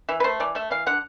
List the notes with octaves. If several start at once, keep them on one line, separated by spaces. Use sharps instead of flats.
E3 E5
B4
A3 C5
E3 D5
A3 E5
E3 F5
D3 F#5